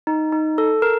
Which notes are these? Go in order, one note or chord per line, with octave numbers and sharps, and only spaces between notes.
D#4
D#4
A4
A#4